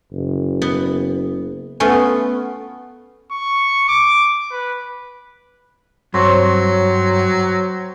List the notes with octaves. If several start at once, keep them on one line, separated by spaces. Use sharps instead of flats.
F#1
B3
A3 B3 C#4 F4 B4 G#5
C#6
D6
B4
G2 F#3 C4 C#5